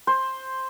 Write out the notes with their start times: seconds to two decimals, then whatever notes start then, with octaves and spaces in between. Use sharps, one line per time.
0.07 C5